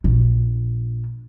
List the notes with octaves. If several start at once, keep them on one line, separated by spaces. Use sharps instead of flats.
A#1